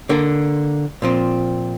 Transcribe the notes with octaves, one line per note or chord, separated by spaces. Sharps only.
D3 A#3 D4
A#2 F3 C4